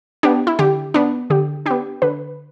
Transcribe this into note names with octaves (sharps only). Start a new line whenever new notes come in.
B3 D4 G4
E4
D3 G4
B3 D4
D3 G4
B3 D4 G4
D3 B4